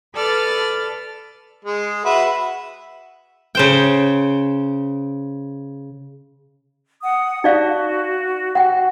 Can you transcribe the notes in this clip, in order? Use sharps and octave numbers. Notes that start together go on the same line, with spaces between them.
A4 B4 D5 F6 A6
G#3
F#4 B4 E5
C#3 C5 G5
F#5 D#6
D#4 F#4 D5 F5
F#5 G5